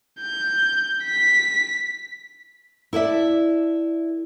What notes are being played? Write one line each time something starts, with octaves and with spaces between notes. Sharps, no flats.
G6
B6
E4 A4 D5 E5